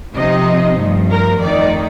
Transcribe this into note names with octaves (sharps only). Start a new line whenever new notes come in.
C3 F3 C4 D#4 D#5
G2 F3 A3
A#4
F2 D#3 A3 D#4 D5